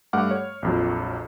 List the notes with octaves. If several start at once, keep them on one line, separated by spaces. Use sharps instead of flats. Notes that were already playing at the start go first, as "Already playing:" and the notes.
G2 A3 F#5 D6 F6
C#5
A#1 F2 F#3